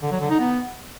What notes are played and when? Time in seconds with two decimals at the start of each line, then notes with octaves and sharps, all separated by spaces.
0.02 D3
0.12 F#3
0.21 D3
0.30 D#4
0.39 B3